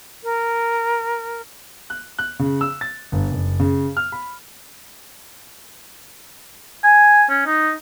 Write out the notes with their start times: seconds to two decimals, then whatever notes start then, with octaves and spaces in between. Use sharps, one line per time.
0.24 A#4
1.90 F#6
2.19 F#6
2.39 C#3
2.61 E6
2.81 A6
3.12 G1
3.31 F#1
3.60 C#3
3.97 F6
4.12 B5
6.84 G#5
7.30 C#4
7.46 D#4